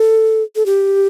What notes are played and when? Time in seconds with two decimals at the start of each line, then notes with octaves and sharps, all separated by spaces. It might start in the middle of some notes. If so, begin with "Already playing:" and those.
Already playing: A4
0.56 A4
0.66 G4